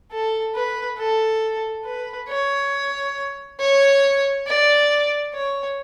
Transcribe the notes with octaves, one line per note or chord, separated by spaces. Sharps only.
A4
B4
A4
B4
C#5
C#5
D5
C#5